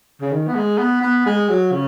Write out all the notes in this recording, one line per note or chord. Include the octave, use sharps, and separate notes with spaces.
C#3
D#3
B3
G#3
B3
B3
G#3
F#3
C#3